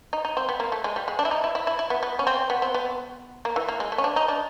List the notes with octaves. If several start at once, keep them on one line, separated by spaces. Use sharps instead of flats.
D#4
D#4
C4
B3
A#3
A3
G#3
G3
G#3
D4
E4
D#4
E4
E4
E4
E4
B3
B3
C#4
C4
B3
C4
B3
A#3
E3
A#3
G#3
A3
C#4
D4
D#4
D4